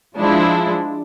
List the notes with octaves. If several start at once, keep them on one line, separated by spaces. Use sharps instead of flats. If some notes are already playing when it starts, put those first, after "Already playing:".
F3 G#3 D4 E4